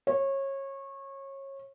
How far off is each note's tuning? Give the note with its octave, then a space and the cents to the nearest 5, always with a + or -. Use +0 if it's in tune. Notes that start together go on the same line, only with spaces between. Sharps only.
C#5 -25